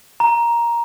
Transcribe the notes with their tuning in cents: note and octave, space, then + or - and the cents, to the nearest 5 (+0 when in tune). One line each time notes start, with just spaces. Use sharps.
A#5 +10